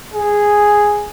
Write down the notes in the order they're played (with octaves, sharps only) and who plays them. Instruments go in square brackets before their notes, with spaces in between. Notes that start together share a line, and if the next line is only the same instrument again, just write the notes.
[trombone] G#4